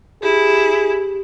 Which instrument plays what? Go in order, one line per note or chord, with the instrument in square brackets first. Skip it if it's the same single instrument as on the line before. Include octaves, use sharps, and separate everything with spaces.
[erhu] E4 [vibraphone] G4 [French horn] G#4